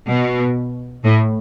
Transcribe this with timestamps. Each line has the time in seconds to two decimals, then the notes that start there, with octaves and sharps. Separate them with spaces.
0.09 B2
1.03 A2